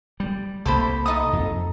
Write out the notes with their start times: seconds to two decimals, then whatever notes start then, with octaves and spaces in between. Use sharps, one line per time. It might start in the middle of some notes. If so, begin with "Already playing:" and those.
0.20 G3
0.65 C2 A#3 A4 C5 B5
1.06 D#4 A4 D#6
1.33 F2